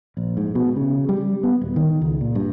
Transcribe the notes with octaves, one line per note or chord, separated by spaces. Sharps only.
A#1
G#2
B2
C#3
G3
B3
D1
D#3
C#2
A#2
G2